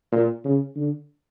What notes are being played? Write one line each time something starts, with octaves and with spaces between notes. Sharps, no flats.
A#2
C#3
D3